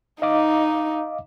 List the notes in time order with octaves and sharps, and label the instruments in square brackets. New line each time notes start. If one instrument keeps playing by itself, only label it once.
[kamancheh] D#4 [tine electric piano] D#5 F5 D6